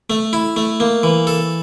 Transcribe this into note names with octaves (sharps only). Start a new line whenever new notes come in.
A3
E4
A3
A#3
E3
A4